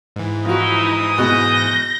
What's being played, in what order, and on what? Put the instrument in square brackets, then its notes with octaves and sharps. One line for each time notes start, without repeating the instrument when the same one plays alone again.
[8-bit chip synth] G#2 E3
[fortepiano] F3 F#4 [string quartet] D#4 E4 [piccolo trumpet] D#6
[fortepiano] B2 G#3 [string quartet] G6 A#6